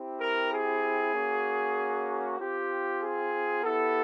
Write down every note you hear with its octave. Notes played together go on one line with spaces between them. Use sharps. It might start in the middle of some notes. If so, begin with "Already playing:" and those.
Already playing: C4 E4 G4
A#4
G#4
A#3 C#4 F#4
C4 F4 G4
G#4
B3 E4 G4 A4